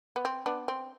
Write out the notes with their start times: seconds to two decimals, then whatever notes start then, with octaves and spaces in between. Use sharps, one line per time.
0.16 B3
0.25 C4
0.46 B3 D4
0.68 C4